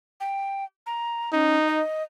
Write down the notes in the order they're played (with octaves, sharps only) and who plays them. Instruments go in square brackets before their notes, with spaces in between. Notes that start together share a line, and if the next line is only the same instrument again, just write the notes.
[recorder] G5
A#5
[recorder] C#4 [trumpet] D#4
[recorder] D#5